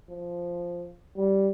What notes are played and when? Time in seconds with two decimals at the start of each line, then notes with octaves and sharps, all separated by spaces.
0.10 F3
1.16 G3